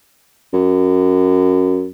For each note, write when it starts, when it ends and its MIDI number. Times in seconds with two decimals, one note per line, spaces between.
0.53 1.88 42